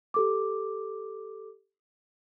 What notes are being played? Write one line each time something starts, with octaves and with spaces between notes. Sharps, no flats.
G4 A4 D6